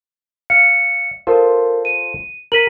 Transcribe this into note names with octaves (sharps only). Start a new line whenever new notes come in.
F5 C#7
F4 A4 A#4 C5
D#7
A#4 B6 D#7 F#7